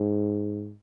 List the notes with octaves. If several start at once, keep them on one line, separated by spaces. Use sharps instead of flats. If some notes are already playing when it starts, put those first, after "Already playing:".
Already playing: G#2